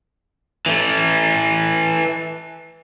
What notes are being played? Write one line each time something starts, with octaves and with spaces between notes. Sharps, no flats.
E3 A3